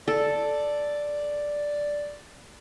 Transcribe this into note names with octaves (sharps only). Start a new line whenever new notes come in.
A4 D5